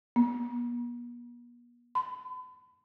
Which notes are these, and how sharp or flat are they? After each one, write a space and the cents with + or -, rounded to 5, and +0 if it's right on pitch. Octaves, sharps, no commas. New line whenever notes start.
B3 -45
B5 +45